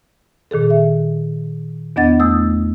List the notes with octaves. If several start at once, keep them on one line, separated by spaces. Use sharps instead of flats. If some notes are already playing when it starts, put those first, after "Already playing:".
A#2 D#3 G#4 A4
E5
E2 B3 D4 D#5 F#5 A6
E2 A3 D#6 E6